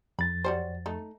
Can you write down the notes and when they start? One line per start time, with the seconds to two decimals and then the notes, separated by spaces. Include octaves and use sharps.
0.19 F2 B5 A6
0.44 F#3 G3 C5
0.86 A3 D#4